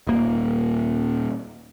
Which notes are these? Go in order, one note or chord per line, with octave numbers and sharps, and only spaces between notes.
D#1 A#3